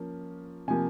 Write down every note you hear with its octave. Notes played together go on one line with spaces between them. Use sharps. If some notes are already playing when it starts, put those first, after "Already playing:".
Already playing: F3 A#3 C#4
C3 F3 A#3 G#5